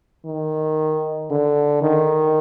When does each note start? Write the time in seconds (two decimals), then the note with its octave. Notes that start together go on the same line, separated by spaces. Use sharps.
0.26 D#3
1.31 D3
1.82 D#3